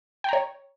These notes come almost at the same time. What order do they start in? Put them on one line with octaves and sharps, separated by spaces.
G5 A#5 C#5